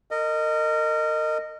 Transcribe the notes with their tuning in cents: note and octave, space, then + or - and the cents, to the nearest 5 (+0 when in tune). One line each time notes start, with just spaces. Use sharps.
A#4 -30 D#5 -10